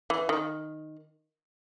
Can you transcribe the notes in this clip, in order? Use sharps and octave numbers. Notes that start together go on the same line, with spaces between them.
E3
D#3